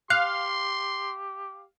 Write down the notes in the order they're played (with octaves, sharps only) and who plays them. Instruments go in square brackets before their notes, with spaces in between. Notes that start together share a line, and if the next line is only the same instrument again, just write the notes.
[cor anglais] G4 [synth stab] F5 [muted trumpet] C6 [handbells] F#6